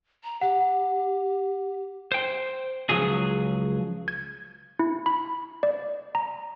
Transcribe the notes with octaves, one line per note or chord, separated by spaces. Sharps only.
A#5
G4 F#5
C5 G5
C#2 F3 F#3 G#4
G#6
E4
B5
D5
A#5